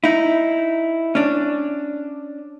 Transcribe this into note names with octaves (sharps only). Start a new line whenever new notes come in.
D#4 E4
C#4 D4